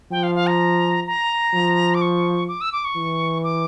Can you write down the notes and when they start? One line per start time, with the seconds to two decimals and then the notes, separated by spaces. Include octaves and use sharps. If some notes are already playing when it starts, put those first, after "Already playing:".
0.11 F3 G5
0.23 F5
0.35 F5
0.47 A#5
1.07 A#5
1.54 F3
1.94 D6
2.01 C#6
2.48 D6
2.61 E6
2.72 D6
2.85 C#6
2.96 E3
3.44 D6